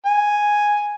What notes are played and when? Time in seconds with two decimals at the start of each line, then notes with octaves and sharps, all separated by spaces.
0.06 G#5